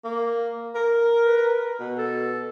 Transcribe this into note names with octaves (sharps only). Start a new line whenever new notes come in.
A#3
A#4
B4
B2
A4